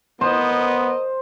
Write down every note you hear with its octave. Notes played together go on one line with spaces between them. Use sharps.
B3 A#4 C5 D#5